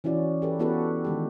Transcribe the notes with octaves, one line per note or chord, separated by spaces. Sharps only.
E3 C#4 E4 F#4 D5
G4 A4 B4
B3 E4 F#4 G4 A4 B4
D#3 G#3 G4